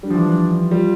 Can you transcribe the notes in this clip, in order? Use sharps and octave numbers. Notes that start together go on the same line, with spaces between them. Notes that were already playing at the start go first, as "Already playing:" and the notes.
G3 D4
F3
E3
F3
G3 F4